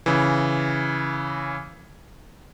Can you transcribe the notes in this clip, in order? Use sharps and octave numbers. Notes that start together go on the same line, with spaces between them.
C#3 E3